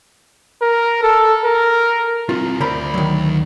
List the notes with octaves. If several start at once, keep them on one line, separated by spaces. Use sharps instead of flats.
A#4
A4
A#4
C4 E4 F4
D2 A#4 C5 D5 B5
D#3 F#3